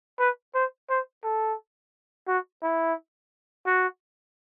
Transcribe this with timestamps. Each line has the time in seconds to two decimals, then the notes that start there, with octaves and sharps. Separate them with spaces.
0.19 B4
0.55 C5
0.90 C5
1.23 A4
2.28 F#4
2.63 E4
3.66 F#4